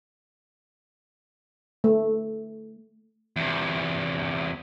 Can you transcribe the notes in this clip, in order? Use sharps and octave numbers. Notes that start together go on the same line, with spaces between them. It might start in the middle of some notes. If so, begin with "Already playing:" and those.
A3
E2 C3